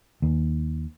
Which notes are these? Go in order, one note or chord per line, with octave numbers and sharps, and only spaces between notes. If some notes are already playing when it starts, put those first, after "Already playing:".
D#2